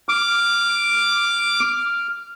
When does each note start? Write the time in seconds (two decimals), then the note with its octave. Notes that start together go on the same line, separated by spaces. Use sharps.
0.09 D6 F6